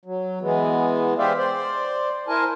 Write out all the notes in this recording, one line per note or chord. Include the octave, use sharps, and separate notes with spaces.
F#3
E3 G#3 B3
G4 G#4 C5 D5 E5 F5
C5 D5
E4 A#4 C5 G#5 A5